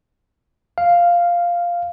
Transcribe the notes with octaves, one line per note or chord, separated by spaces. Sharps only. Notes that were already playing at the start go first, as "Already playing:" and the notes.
F5